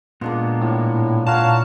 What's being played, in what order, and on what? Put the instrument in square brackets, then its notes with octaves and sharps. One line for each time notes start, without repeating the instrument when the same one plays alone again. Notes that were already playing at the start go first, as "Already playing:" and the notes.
[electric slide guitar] A#2 G#3 B3 [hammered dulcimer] A#3 D4 F4
[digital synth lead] A2
[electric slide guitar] A#2 A#5 [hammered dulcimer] E3 F4 [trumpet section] C#5 F5 F#5 [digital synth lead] A5